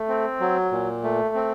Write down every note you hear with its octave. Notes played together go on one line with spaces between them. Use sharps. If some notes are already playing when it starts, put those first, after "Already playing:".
Already playing: A3
C4
F#3
A#2
A3
C4